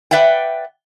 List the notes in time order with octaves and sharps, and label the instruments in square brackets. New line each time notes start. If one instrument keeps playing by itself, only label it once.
[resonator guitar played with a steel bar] B4 D5 E5 F#5 G5